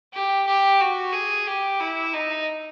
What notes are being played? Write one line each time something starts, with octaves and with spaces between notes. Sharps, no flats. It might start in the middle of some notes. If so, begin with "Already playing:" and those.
G4
G4
F#4
G#4
G4
E4
D#4